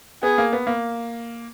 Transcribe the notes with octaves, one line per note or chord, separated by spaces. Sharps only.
B3 G#4
A#3
B3
A#3